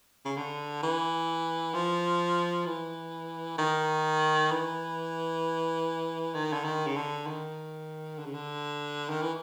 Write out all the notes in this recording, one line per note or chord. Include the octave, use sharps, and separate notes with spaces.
C#3
D3
E3
F3
E3
D#3
E3
D#3
D3
D#3
C#3
D3
D#3
D3
C#3
D3
D#3
E3